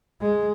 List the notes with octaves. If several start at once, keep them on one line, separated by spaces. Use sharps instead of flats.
G#3